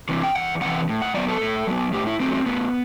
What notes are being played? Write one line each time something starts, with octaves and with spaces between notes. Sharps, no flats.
C3 E3
G5
E2 F#5
C3 E3 F#5
A2
F#5
F#3 B3 D5
A4
A2
F#3 B3
A2 G4
E4
F#3 A3 C4
C4
A2 B3